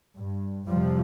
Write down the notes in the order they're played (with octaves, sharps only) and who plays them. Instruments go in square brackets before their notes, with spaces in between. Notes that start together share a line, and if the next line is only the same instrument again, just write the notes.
[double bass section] G2
F2 C3 F3 G3